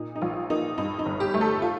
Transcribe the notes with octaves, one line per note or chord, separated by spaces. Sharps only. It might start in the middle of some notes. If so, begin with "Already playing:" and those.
Already playing: A#2 D#4
D#4
A#1 F4
A#3 D#4
G2 D#4
D#4
G1
G4
A3
A4
F4